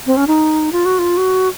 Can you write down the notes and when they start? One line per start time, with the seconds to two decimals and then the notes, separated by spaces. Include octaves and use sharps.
0.07 C4
0.17 C#4
0.27 D#4
0.72 F4
0.85 F#4
0.99 F4
1.17 F#4